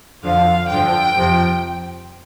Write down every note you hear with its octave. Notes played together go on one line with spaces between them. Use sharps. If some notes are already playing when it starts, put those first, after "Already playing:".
F2 D3 F3 F5
G2 D3 F3 G5
F2 C3 F3